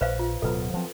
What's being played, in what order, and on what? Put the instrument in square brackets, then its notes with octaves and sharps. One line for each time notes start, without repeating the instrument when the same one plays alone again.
[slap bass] A#1 [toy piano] B4 C5 F5
[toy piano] F4
[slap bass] D1 B2 F#3 [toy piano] A4 B4
[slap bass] F3 F#3 C4